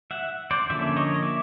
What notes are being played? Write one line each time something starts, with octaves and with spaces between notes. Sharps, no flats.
E5 F#5
C5 D5
D3 F3 A#3 C#4 D5 E5
C#5 D#5
D#5
D5 E5